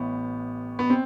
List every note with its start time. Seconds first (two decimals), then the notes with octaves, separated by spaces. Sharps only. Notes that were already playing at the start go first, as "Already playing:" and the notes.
Already playing: A1 A2 E3 B3
0.79 B3
0.90 C4